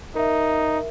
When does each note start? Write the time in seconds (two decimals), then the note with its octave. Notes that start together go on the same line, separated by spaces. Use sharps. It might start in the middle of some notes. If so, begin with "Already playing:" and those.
0.15 D#4 A#4 E5